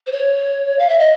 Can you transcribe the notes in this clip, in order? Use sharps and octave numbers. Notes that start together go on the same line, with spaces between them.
C5
C#5
F5
E5
D#5